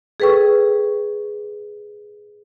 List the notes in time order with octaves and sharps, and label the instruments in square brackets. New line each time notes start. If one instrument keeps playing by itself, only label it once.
[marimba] G#4 A4 B4 G5 C#6